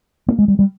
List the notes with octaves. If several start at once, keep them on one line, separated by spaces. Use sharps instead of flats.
A#3
G#3
G3
G3